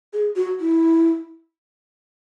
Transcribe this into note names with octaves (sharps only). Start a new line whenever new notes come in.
G#4
F#4
E4